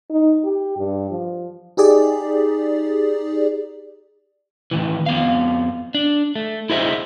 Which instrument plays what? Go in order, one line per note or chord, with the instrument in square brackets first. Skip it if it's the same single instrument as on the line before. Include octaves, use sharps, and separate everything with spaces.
[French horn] D#4
G4
G2
F3
[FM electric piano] D#4 G4 G#4 D5
[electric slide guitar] A2 D#3 E3
F2 B3 F5
D4
A3
E4 G#4 C5 D#5 E5